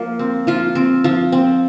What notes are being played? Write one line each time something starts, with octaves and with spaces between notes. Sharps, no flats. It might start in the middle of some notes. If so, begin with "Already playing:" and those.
Already playing: F3 A#3
C4
F3 F4
C4
F3
C4